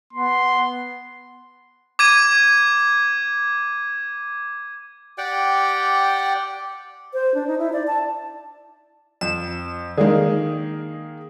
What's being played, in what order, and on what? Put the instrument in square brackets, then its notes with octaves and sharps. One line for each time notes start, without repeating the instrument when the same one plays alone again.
[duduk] B3 [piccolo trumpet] C6
[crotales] D6 G#6 D#7
[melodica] G4 D5 F#5 G5
[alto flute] C5
D4
D#4
E4
D5
A5
[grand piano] F2 [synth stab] E7
[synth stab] D3 G#3 [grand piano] D#3 A#3 G#4